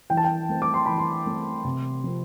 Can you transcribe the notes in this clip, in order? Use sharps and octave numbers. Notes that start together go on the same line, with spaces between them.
E3 G5
A5
G5
A3 C4
D6
C6
E3 B5
C6
A3 C4
C3
F3 C4